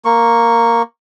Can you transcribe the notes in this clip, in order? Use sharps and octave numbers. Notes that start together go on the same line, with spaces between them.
A#3 C#6